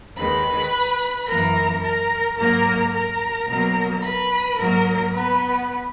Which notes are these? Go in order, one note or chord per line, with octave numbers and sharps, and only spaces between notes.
D#2 D#3 G#3 B4 B5
F#2 E3 A#3 A#4 A#5
A#4 A#5
G#2 F#3 A#3 A#4 A#5
A#4 A#5
B2 F#3 A#3
B4 B5
G#2 F#3 A#3 A#4 A#5
B3 B4